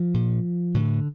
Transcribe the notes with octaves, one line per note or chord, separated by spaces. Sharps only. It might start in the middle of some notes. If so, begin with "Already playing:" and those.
Already playing: F3
A#2
A2 D3